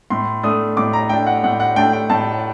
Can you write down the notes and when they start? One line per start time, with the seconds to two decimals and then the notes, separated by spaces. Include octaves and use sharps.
0.10 A2 C6
0.43 A3 D4 D#6
0.77 A2 D6
0.93 A#5
1.09 A3 D4 G5
1.27 F#5
1.43 A2 F#5
1.60 F#5
1.76 A3 D4 G5
1.93 G5
2.10 A2 A5